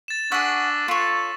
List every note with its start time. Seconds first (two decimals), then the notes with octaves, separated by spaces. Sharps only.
0.08 A6 E7
0.32 D4 G#4 F#5 C#6 E6 B6
0.88 F4 A4 C#5 B6 E7